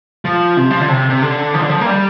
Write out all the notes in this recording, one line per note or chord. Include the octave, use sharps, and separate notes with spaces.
F3
C3
F3
D3
C3
C3
D3
F3
D3
F3
A#3
G3